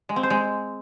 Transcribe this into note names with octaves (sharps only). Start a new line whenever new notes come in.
G#3
C4
C5
G#3